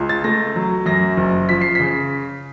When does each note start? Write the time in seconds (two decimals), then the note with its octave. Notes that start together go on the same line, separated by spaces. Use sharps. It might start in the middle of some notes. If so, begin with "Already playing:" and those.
Already playing: C#2 C#3
0.09 A6
0.24 A3 A#6
0.56 F#3
0.86 F#2 A#6
1.17 F#1
1.49 F3 B6
1.62 C7
1.75 C#3 B6